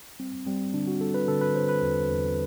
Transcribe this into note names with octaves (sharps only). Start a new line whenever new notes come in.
G3 C4
G3 C4
D3 D4
F#4
G3 A4
B4
D3 A4
B4
D3 C5
B4
E2
E2